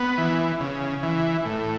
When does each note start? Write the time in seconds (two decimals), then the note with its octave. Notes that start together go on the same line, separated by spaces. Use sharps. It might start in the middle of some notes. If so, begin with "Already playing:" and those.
Already playing: B3
0.18 E3
0.60 C#3
1.03 E3
1.45 A2